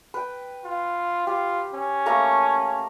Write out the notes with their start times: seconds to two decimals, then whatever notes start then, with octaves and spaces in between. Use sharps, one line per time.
0.14 B4 G5
0.65 F4
1.27 F4 G4
1.75 C#4
2.06 A3 A#3 A#5